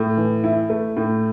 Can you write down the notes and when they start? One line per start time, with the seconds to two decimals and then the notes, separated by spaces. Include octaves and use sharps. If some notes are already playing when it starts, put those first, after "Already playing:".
Already playing: A2
0.17 E3
0.44 E4
0.69 A3
0.97 A2